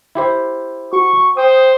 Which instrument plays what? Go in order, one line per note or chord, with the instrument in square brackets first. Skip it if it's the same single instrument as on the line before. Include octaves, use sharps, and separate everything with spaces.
[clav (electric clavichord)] E4 G4 C5
[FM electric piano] F#4 [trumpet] C#6
[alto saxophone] C5 [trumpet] G5 [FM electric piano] D#6